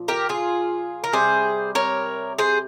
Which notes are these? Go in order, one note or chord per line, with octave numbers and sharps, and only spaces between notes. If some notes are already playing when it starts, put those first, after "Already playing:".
Already playing: A#2 F3
G4 A#4
F4 G#4
A#4
C3 G3 G#4 C5
A#4 C#5
G#4 C5